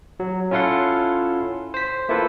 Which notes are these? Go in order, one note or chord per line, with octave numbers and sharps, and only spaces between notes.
F#3
C#4 E4 F4 A4 F#5 C6
C5 B6
A#3 E4 F4 A4 B4